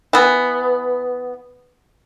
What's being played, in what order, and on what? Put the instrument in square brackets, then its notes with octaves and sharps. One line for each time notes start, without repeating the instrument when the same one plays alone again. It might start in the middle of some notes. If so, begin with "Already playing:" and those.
[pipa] E3 B3